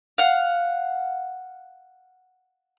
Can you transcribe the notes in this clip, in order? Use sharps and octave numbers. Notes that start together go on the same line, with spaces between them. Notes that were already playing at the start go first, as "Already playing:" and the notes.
F5 F#5